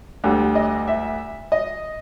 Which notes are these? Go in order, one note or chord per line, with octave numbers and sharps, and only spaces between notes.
D2 D3 G3
D#5
E5
D#5